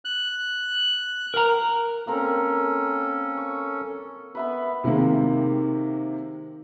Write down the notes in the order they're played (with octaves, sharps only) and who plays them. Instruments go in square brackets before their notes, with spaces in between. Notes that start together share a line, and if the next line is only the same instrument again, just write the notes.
[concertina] F#6
[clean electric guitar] A#4 A#5
[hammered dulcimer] A#3 C4 A#4 [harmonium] C#4 A4
[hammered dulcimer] C#6
[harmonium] B3 [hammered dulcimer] B4 E5 B5
[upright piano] C3 D#3 G#3 A#3 C4